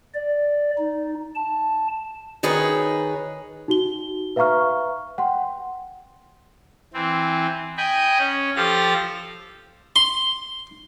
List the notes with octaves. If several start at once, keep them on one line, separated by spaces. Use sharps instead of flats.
D5
D#4
A5
D#3 D#4 G#4 B4 C#5
D#4 F#4 G7
B4 E5 F5 A#5 C#6 F6
F#5 G5 C6
E3 C4
D#5 G5 G#5 B5
C#4
F3 G4 A4 F5 A#6
C6